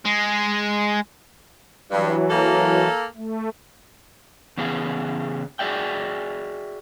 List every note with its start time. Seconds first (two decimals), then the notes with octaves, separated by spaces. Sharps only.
0.05 G#3
1.92 G2 E3 F#3
2.30 A#3 A4
3.16 A3
4.58 C#3 E3 B3 G#4 F5
5.59 F#4 G#4 D5 E5 G5